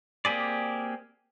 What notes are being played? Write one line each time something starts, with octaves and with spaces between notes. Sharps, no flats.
A#3 C4 G4 G#4 D5